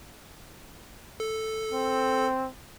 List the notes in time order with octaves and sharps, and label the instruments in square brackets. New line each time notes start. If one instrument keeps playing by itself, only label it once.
[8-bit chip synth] A4
[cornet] C4